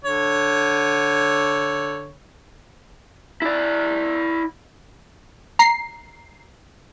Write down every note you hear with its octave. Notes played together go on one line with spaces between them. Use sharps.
D3 C#5
E4 D5
A#5 C7